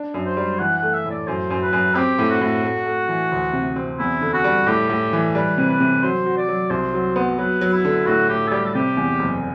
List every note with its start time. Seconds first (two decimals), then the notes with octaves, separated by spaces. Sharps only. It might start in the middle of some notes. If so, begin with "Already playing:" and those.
Already playing: D4
0.14 F#2
0.26 C5
0.37 G3
0.59 E3 F#5
0.77 F#5
0.83 A3
0.94 E5
1.06 A2
1.11 D5
1.27 F#2 C5
1.50 F#2
1.62 B4
1.73 F#2
1.95 C4 G4
2.19 A2
2.30 F#4
2.41 A2
2.63 A3
2.86 A3
3.09 E3
3.32 D2
3.53 C3
3.76 C4
3.99 E2 E4
4.21 D3
4.34 F#4
4.44 G3
4.67 A2 G4
4.89 A2
5.13 E3
5.35 G3 B4
5.58 C3
5.69 B4
5.80 C3
6.02 F#3 C5
6.26 F#4
6.37 D5
6.49 F#3
6.70 C2 C5
6.94 F#3
7.16 B3
7.38 F#3 B4
7.61 F#3
7.73 E4
7.85 D3
8.06 A2 F#4
8.29 A2 G4
8.48 A4
8.51 G3 G4
8.65 A4
8.74 C3 G4
8.97 E2
9.19 F#1